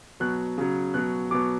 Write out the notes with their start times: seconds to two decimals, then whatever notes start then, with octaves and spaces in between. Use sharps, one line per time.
0.20 B2 F#3 F#6
0.58 C#3 F#3
0.94 B2 F#3 F#6
1.31 B2 F#3 D6